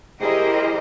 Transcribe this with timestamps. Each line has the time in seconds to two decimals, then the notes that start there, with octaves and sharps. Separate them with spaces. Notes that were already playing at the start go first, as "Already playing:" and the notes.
0.20 E4 G4 G#4 A#4 C5 D#5